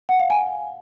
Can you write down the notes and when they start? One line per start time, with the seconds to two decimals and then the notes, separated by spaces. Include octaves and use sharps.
0.09 F#5
0.19 F5
0.30 G#5